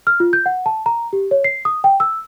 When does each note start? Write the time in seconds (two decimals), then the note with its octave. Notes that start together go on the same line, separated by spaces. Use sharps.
0.07 F6
0.20 F4
0.33 G6
0.46 F#5
0.66 A5
0.86 A#5
1.13 G4
1.31 C#5
1.44 C7
1.65 D#6
1.84 G5
2.00 E6